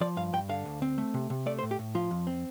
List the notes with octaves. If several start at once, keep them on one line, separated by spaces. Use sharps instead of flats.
F3 D5
G2 F5
G2 G5
D3 F5
D2
C4
A3
C3
C3
A3 D5
C5
A2
G4
A2
F3 F4
F2
C4